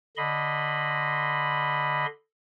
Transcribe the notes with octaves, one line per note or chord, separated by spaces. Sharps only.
D3 D#5 B5 C6